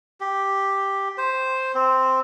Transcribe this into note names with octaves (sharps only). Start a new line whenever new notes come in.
G4
C5
C4